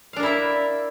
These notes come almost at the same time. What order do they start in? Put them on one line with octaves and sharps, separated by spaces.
F5 D4 A#4 E4 E5